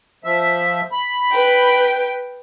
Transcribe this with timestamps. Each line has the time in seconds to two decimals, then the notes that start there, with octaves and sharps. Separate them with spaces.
0.24 F3 E5
0.92 B5
1.32 B4 G5